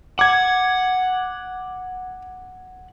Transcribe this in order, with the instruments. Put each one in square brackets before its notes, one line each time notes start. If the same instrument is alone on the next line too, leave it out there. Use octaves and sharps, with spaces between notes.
[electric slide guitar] F#5 [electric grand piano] D6 G#6